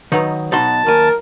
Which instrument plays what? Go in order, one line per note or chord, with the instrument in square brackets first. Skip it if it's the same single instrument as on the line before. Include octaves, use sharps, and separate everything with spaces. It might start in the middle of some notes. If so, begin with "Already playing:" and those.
[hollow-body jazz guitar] D#3 [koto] F#3 B3 D#4
[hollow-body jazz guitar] B2 F#4 C6 [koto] D#4 [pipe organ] A5
[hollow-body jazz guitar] D#2 G#5 [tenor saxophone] A#4